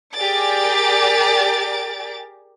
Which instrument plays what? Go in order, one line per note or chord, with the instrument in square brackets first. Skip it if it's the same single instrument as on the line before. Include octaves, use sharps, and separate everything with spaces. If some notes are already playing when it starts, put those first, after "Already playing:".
[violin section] G4 G#4 A#4 D5 A6 D7